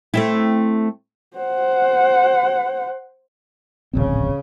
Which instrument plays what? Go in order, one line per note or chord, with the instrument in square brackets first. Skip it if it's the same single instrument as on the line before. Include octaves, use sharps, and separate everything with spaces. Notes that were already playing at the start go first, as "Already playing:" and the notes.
[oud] A3 C4 E4
[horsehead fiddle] C5 F#5
[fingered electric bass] D1 A#1 C4 [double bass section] C#3